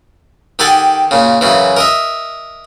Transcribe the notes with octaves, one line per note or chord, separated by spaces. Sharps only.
D#3 G4 A4 F#5 G#5 A5
A#2 C#3
F#2 C#3 E3
A#4 D#5 E5